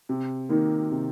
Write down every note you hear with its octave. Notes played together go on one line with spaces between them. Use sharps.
C3
D#3 A#3 D#4
C3